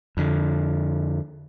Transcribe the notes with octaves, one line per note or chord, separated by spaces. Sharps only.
F2 D3